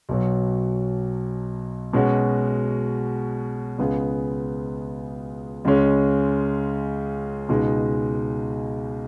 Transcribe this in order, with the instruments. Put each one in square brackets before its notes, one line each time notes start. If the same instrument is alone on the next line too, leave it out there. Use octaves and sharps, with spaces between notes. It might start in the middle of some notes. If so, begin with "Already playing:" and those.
[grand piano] B1 B2 F#3
B2 G#3 C#4 F#4
C#2 C#3 B3 G#4
C#2 C#3 G#3 C#4
C#2 B2 G#3 D#4